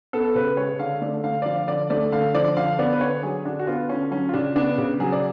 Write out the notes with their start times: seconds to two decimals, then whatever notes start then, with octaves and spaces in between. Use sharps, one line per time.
0.13 B3 A4
0.35 C#3 B4
0.57 G#3 C#5
0.79 D3 F5
1.02 A3 D5
1.24 D3 F5
1.42 D5
1.46 F3 F5
1.68 D3 D5
1.90 A3 D5
2.12 D3 F5
2.34 F3 D5
2.57 D3 F5
2.79 B3 D5
2.93 B4
3.01 D3 C#5
3.23 F#3 G#4
3.45 D3 D4
3.59 F#4
3.67 B3 F4
3.89 D3 C#4
4.11 F#3 C#4
4.29 F4
4.34 C#3 D4
4.56 B3 D4
4.78 C#3
5.00 F#3 G#4
5.12 D5